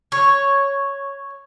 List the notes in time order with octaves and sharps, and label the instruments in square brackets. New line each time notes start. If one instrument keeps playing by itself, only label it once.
[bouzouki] C#5